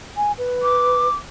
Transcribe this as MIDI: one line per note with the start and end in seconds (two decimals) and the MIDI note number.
0.16 0.32 80
0.38 1.07 71
0.63 1.14 86